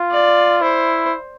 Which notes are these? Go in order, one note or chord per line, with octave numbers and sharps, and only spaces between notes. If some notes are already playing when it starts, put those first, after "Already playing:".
Already playing: F4
D5
E4 C5